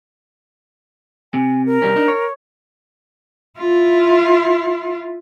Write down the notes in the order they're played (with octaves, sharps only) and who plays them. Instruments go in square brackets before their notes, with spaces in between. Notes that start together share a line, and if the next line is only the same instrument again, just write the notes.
[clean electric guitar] C3 [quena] G#5
[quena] A#4
[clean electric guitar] C2 G3 C#4
D4 D#4
C#5
[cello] E4 F4